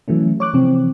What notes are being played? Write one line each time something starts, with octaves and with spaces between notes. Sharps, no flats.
E3 F#3 A3 C#4
C#5 D6 F#6
C3 E3 F3 C4